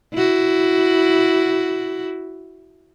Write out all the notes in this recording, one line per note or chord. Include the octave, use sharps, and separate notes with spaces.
E4 F#4